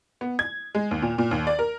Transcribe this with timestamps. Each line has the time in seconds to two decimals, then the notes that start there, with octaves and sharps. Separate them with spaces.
0.21 B3
0.39 G#6
0.75 G#3
0.91 D#2
1.02 A#2
1.18 A#2
1.31 D#2
1.47 D5
1.59 A#4